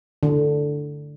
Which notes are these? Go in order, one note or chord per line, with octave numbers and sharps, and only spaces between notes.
D3